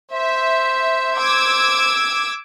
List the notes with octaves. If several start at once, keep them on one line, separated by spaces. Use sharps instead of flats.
C5 E5
D6 E6 G#6